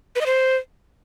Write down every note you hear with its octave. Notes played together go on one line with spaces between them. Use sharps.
B4
D#5
C5